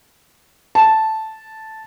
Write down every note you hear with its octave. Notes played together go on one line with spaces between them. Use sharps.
A5